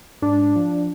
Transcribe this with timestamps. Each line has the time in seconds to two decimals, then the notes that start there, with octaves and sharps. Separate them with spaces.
0.22 G#2 D4
0.56 F3